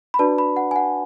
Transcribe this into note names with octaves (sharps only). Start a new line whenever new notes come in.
B5
D4 F#4 B4 D5 A5
B5
F#5
G#5
F#5